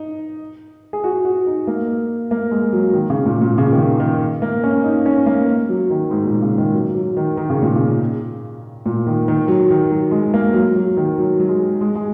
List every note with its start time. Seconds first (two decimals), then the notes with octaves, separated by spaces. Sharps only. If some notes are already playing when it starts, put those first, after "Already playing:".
Already playing: D#4
0.93 G#4
1.04 F#4
1.25 F#4
1.47 D#4
1.67 A#3
2.31 A#3
2.51 G#3
2.73 F#3
2.93 D#3
3.10 C#3
3.26 A#2
3.42 A#2
3.58 C#3
3.72 D#3
3.78 C#3
4.00 D#3
4.42 A#3
4.64 C#4
4.84 D#4
5.06 C#4
5.26 A#3
5.69 F#3
5.90 D#3
6.11 G#2
6.26 A#2
6.42 C#3
6.58 D#3
6.74 F#3
6.95 F#3
7.17 D#3
7.37 D#3
7.50 C#3
7.62 A#2
7.76 C#3
8.86 A#2
9.07 D#3
9.28 D#3
9.48 F#3
9.70 D#3
9.91 F#3
10.11 G#3
10.34 A#3
10.54 F#3
10.76 F#3
10.97 D#3
11.18 F#3
11.40 F#3
11.49 G#3
11.81 G#3
11.95 G#3